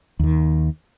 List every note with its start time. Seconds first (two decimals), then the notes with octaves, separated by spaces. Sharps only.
0.19 D#2 D#3